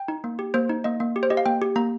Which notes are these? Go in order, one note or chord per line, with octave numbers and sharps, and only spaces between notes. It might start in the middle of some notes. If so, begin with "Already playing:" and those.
Already playing: G5
D#4
A#3
G4
A#3 C5
D#4
A#3 D#5
A#3
G4
C5
G4 D#5
F5
A#3 G5
G4
A#3 A#5